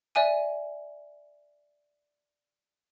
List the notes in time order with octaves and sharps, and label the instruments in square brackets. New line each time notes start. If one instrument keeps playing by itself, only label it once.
[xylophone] D5 E5 G#5 D#7